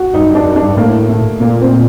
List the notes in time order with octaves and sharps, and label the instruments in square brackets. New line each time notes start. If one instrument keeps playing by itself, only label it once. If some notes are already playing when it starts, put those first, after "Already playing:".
Already playing: [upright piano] F#4
[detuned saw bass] G2 [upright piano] D#4
[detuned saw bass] G2
[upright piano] D4
[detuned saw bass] F#2
[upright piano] D4
[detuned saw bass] G2
[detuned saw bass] A2 [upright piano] A#3
[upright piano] A3
[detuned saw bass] A#2 [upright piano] A#3
[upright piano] C4